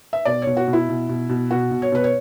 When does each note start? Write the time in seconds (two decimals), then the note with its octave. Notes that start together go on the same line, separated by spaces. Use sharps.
0.13 E5
0.25 B2 D5
0.42 B2 C#5
0.57 F#4
0.68 B2
0.73 E4
0.89 B2
1.09 B2
1.29 B2
1.51 B2 F#4
1.71 B2
1.82 C#5
1.92 B2 B4
2.04 C#5